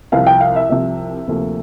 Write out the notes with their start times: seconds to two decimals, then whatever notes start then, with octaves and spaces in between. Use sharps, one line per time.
0.12 C2 C3 F3 F5
0.27 G5
0.41 F5
0.56 E5
0.69 C2 C3 F3 E5
1.27 D2 C3 F3 A#3